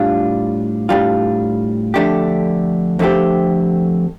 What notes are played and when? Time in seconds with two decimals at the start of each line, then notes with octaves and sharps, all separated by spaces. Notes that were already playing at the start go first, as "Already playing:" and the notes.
Already playing: A2 G3 D4 F4
0.89 A2 G3 D4 F4
1.94 F2 D3 A3 D4 G4
2.99 F2 D3 A3 C4 G4